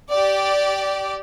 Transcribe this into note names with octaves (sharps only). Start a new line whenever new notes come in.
G4 D5